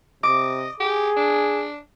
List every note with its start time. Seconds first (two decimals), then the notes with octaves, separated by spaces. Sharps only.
0.23 C3 D#5 D6
0.80 G4 G#4
1.16 D4